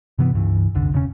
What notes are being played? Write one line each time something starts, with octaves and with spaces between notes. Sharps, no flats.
G2 C3 E3 B3
C#2 G2 E3
F1 C2 D3
E1 C#3 C#4